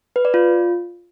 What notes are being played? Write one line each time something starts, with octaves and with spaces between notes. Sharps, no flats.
B4
D5
F4